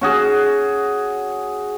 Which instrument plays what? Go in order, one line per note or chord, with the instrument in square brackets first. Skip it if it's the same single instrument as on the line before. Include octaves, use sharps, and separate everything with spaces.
[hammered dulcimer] C#4 F#4 G#4